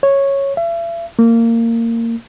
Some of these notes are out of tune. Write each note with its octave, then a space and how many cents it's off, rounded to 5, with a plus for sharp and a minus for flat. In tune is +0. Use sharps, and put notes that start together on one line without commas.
C#5 -5
E5 +40
A#3 -20